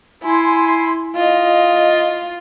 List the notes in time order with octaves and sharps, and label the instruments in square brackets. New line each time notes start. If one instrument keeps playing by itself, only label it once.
[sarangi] E4 [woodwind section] G#5 C6
[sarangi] F4 [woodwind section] D#5